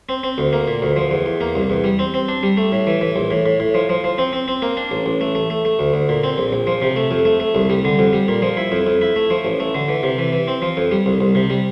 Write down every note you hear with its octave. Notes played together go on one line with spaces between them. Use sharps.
C4
C4
D2
A#3
A#2
D2
F3
E2
E2
A#3
C2
E2
G3
C4
C4
D4
G3
A3
A2
E3
E3
A#1
A2
A2
A2
F3
F3
F3
C4
C4
C4
A#3
D4
A1
A1
A3
A3
A3
A3
D2
D2
A#2
C4
A#1
A#1
F3
C3
A3
F2
A3
A3
C2
G3
D3
F2
G3
A#2
F3
E4
F2
F2
E4
A3
F3
A1
A3
D3
E3
C3
E3
E3
C4
F3
F2
G3
C2
C2
C3
G3